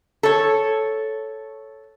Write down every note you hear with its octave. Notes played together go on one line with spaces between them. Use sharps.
A4 C#5